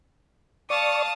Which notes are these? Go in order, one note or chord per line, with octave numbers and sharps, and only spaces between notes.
D5 F5 A5 C#6 D#6